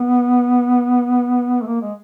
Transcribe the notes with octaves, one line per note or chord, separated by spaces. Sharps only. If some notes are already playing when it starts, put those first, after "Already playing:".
Already playing: B3
A3
A#3
G#3